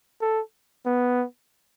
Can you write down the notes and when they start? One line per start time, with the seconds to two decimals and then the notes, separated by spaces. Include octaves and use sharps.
0.21 A4
0.86 B3